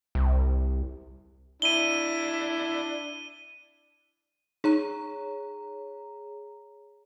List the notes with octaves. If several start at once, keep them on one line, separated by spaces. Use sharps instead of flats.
C2
D4 E4 D#7 G7
D#4 G#4 C#5 A#5